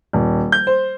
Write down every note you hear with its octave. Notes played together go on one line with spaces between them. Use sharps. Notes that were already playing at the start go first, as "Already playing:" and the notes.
D#1
G6
C5